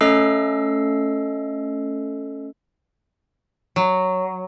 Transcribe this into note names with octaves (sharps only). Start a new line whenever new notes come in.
A3 C#4 A4 D#5 E6 C7
F#3